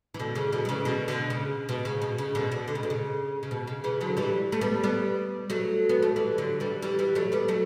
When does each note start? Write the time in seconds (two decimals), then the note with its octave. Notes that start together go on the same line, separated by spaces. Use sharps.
0.14 E3
0.19 B2 D3
0.35 C#3 E3
0.53 B2 D3
0.65 F#3
0.69 C#3 E3
0.85 B2 D3
1.08 B2 D3
1.30 C#3
1.69 B2
1.85 C#3
2.02 B2
2.18 C#3
2.35 B2 D3
2.52 B2 D3
2.68 D3
2.75 C#3
2.83 B2
2.90 C#3
3.43 C#3
3.51 B2
3.67 C#3
3.84 C#3 E3
4.01 D3 F#3
4.17 E3 G3
4.52 A3
4.61 G3 B3
4.84 G3 B3
5.50 F#3 A3
5.89 B3
6.03 A3
6.16 E3 G3
6.38 D3 F#3
6.60 E3 G3
6.82 E3 G3
6.99 E3 G3
7.15 F#3 A3
7.32 G3 B3
7.48 F#3 A3